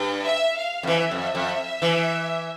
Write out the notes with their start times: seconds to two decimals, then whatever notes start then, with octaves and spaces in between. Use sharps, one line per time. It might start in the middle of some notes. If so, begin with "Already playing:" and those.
Already playing: G2
0.24 E5
0.56 F5
0.83 F2
0.87 E3 E5
1.11 F2
1.35 F2
1.82 E3